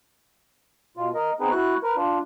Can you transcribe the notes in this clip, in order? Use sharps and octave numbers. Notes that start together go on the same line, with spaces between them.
B2 F4
A#4 D#5
B3 C4 D#4 G#4 B4
E4 F#4 C#6 F#6
A#4 B4
D4 F4